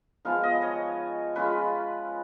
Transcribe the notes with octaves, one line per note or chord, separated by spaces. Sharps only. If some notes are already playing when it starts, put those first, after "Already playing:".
F3 G#3 B3 D#4 F5
D#5
C#5
G#3 C#4 F4 B4